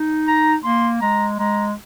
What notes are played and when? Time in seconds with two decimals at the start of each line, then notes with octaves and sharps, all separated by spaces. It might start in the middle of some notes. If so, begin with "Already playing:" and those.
Already playing: D#4
0.27 A#5
0.64 A#3 C6
1.01 G#3 A#5
1.39 G#3 A#5